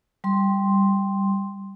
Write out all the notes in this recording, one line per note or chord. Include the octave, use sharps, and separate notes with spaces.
G3 C6